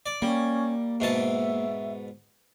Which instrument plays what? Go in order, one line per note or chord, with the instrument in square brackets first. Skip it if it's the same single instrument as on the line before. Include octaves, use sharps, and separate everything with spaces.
[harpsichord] D5
[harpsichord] G3 [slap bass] A#3 [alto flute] C#4
[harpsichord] G#2 B2 A5 [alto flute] E5